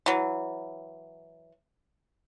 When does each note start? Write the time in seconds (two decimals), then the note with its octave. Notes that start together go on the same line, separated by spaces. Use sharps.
0.06 E3 F#3